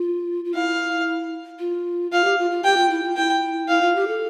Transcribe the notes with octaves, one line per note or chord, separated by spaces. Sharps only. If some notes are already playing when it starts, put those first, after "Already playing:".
Already playing: F4
F4
E4 F5
F4
F4 F5
G4
F4
F4
G4 G5
F4
E4
F4
E4 G5
E4 F5
F4
G4
A4